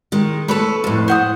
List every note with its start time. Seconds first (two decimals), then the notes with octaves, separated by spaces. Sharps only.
0.12 D#3 G#3
0.48 A3 A4 B4 C#5
0.84 F2 A2
1.08 C5 F#5 D#6